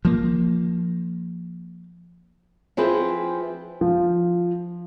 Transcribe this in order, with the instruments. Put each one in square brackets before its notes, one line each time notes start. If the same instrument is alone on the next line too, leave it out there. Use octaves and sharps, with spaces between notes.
[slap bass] F3 A#3
[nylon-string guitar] F3 C4 E4 G#4 B4
[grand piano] F3